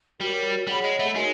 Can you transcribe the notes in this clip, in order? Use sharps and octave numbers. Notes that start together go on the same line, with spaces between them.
G3 F#4 A#4 C#5
G3 G#4 C#5 F#5 B5
G#3
A3
G#3 D#4 F#4 A#4 C#5